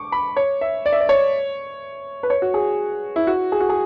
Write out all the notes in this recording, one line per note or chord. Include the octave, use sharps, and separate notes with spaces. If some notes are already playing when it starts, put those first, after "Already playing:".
Already playing: C#6 D6
B5
C#5
E5
D5
E5
D5
C#5
B4
C#5
F#4
G#4
E4
F#4
G#4
F#4
G#4